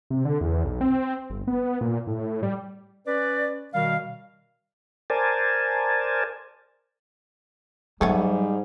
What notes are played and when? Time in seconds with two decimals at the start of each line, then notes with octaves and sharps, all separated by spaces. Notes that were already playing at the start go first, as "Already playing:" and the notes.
0.10 C3
0.25 D3
0.41 E2
0.64 B1
0.81 C4
1.30 G1
1.48 B3
1.81 A#2
2.07 A2
2.43 G3
3.07 C#4 B4 D5
3.74 B2 D#3 G3 F#4 A#4 F5
5.10 A#4 C5 D5 G#5 A5
8.01 G#2 F#3 G3 A3 B3 C#4